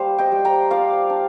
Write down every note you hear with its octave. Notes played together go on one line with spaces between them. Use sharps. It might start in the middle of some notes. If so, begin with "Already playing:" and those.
Already playing: G3 A#3 C5 F5
D#5 G5
G3
G5 A#5
F4 D5 F5
D4